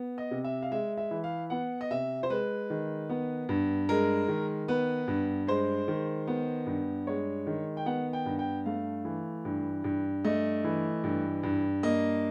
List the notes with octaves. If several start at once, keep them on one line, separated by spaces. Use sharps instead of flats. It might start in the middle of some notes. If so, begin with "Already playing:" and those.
Already playing: B3
D#5
C3
E5
F5
G#3 E5
E5
E3
F5
B3 F#5
D#5
C3 E5
C5
G#3 B4
D#3
B3
G2
G#3 A#4
D#3
B3 B4
G2
G#3 C5
D#3
B3
G2
G#3 C#5
D#3
G5
B3 F#5
G5
G2
G5
A3 F5
E3
G2
G2
A3 D#5
E3
G2
G2
A#3 D#5